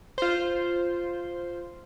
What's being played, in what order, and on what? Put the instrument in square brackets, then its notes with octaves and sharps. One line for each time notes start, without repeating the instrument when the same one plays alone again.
[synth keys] F4 C5